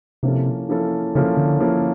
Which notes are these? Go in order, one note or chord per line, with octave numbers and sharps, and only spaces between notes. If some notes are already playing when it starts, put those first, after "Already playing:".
C3 F3 A#3 C#4 E4 A4
F3 A#3 C#4 E4 A4
C#3 F3 A#3 C#4 E4 A4
D3
F3 A#3 C#4 E4 A4